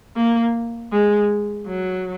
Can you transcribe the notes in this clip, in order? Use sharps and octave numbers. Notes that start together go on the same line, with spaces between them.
A#3
G#3
F#3